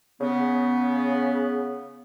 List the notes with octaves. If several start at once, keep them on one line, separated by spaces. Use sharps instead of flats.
C#3 B3